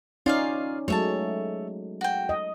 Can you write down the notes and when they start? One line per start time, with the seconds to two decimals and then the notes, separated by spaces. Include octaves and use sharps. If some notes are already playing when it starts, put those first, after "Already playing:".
0.26 C#4 D#4 F4 G#4 D5 F5
0.88 F#3 G#3 A3 C#5 E5 A5
2.01 F#4 G5
2.29 D#5